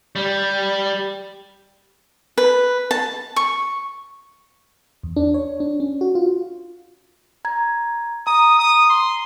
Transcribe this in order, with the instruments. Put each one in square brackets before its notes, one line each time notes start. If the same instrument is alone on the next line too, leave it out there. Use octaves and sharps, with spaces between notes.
[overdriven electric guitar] G3
[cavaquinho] B4
A5
C#6
[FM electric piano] E2
D4
C#5
D4
C#4
F#4
F4
[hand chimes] A#5 G#6
[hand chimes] A#5 [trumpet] D#6
[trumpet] D#6
C6